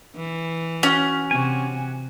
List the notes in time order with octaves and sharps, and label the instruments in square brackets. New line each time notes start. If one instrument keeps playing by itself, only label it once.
[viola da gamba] E3
[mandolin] C#4 [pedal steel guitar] F#4
[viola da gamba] C3 [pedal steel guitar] F#4 G#5